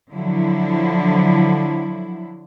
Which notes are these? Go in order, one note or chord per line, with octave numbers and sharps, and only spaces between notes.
D3 F3 F#3 E4